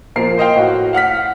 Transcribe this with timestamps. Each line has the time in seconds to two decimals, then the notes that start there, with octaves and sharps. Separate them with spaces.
0.16 A#2 F3 A#4 C7
0.38 C5 D#5 F5 G5
0.56 A2 F#4
0.93 F5 F#5 F6 B6